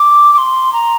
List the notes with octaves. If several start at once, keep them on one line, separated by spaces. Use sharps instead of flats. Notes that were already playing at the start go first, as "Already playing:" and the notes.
Already playing: D6
D6
C6
A#5